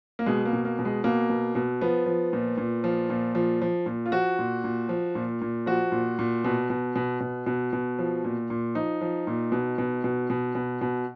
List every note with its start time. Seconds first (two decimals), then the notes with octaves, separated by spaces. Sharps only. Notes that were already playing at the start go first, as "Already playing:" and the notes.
0.19 A#3
0.26 B2 G#3
0.45 A#3
0.53 B2
0.65 A#3
0.79 B2
0.85 G#3
1.04 B2 A#3
1.30 B2
1.55 B2
1.81 F3 B3
2.06 F3
2.33 A#2
2.58 A#2
2.84 F3
3.10 A#2
3.35 F3
3.62 F3
3.86 A#2
4.06 F4
4.12 F3 F#4
4.39 A#2
4.64 A#2
4.89 F3
5.15 A#2
5.42 A#2
5.66 F3 F#4
5.92 A#2
6.19 A#2
6.44 B2
6.70 B2
6.96 B2
7.20 B2
7.46 B2
7.73 B2
7.99 F3
8.25 A#2
8.50 A#2
8.75 F3 D#4
9.01 F3
9.27 A#2
9.52 B2
9.78 B2
10.04 B2
10.30 B2
10.55 B2
10.81 B2